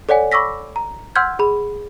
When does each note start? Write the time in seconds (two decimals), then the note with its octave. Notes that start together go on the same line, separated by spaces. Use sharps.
0.09 A4 C#5 D5 F#5 G#5
0.32 B5 C#6 D6 E6 A#6 B6
0.76 A#5
1.16 F#5 C6 E6 F6 G6 G#6
1.39 G#4 B5